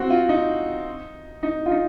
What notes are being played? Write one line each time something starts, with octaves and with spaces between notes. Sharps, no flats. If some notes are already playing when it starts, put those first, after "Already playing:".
Already playing: C4 F#4
F4
D#4
D#4
F4
D#4